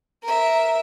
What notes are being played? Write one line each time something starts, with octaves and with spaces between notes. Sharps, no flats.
A#4 E5